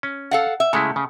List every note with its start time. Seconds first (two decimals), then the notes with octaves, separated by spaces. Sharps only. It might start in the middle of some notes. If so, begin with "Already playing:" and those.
0.03 C#4
0.31 A4 F5 F#5
0.60 E5
0.73 C#3 G#3 A3 E4
0.96 C#3